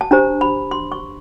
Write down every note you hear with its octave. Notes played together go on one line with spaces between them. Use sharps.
A5
D4 G4 C5 A#5
B5
C6
C#6